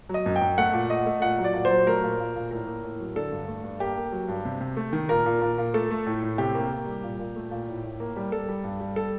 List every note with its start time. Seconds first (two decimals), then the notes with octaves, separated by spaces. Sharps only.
0.09 F#3 D#5
0.26 F#2
0.36 G5
0.41 F#2
0.58 A3 F#5
0.73 A#2
0.90 A3 D#5
1.06 A3
1.22 A#2 F#5
1.39 F#3
1.44 D5
1.54 A#2
1.65 C5
1.70 F#3
1.87 A3 A#4
2.03 A#2
2.20 A#2
2.36 A#2
2.51 A2 A#4
2.67 A#3
2.84 A2
3.00 F#3
3.16 D3 A4
3.31 G2
3.48 A3
3.64 G2
3.80 A#3 G4
3.97 A#3
4.12 F#3
4.28 G2
4.45 C3
4.60 C3
4.77 A3
4.93 D#3
5.09 A#2 A#4
5.26 A#2
5.42 A#2
5.58 A#2
5.74 A3 A4
5.91 A3
6.06 A2
6.23 A2
6.38 C3 G4
6.54 A#3
6.71 A#3
6.86 G3
7.03 A#2
7.19 A#2
7.36 A3
7.51 A#2
7.68 A2
7.83 A2
8.00 A#3
8.16 G3
8.32 G3 A4
8.49 G3
8.64 G2
8.80 G3
8.96 A4